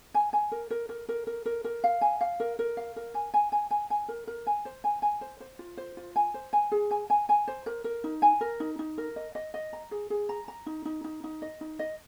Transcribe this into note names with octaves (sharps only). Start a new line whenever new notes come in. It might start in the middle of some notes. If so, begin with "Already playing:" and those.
G#5
G#5
A#4
A#4
A#4
A#4
A#4
A#4
A#4
F5
G#5
F5
A#4
A#4
F5
A#4
G#5
G#5
G#5
G#5
G#5
A#4
A#4
G#5
C5
G#5
G#5
C5
C5
F4
C5
F4
G#5
C5
G#5
G#4
G#5
G#5
G#5
C5
A#4
A#4
D#4
G#5
A#4
D#4
D#4
A#4
D#5
D#5
D#5
A#5
G#4
G#4
A#5
A#5
D#4
D#4
D#4
D#4
D#5
D#4
D#5